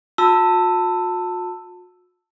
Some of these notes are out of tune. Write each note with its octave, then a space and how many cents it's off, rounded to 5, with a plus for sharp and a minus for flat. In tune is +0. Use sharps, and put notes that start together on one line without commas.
F#4 -45 A5 +20 E6 +0